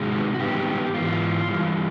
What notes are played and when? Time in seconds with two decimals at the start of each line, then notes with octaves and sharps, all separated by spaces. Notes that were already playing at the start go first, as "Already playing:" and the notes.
Already playing: C3 D#3 G#3 F#4
0.34 F#4
0.40 G2 D#3 G#3 B3 G4
0.94 G#2 E3 F4
1.49 G2 E3 G3